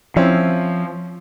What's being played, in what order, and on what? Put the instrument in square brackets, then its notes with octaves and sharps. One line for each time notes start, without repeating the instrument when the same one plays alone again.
[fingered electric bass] F3 [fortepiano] C4 C#4 E4